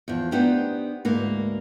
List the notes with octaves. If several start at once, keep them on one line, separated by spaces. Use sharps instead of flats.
E2 F3
B3 D4 D#4 G4 C5
D2 G#2 A#3 B4